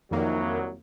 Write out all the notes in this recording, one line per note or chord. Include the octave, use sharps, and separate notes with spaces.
C2 F2 D#3 F#3 A#3